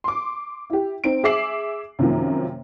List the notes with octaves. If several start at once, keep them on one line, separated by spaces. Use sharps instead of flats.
C6 D6
E4 G4
C4 D#4 D7
G#4 E5 D6 C7 F#7
F#2 C3 D#3 F3 A#3